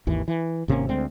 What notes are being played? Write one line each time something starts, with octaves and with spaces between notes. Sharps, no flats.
G#1 D#2 E3
E3
G#1 C3 A#3 C#4
D2 G#3 C4